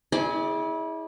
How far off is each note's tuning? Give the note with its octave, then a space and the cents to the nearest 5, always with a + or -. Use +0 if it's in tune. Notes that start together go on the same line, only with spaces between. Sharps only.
E4 -35 G#4 +0 D5 +10